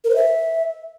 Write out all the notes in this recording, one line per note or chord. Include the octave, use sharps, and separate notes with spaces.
A#4
C5
E5